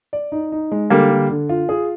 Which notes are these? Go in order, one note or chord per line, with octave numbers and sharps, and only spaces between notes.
D5
D#4
D#4
G#3
D3 G3 A#3
D3
D3
F4
G#4